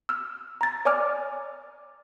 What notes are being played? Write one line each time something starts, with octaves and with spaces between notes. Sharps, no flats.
E6 F6
A#5 A6
C#5 D5 G#5 D6 F6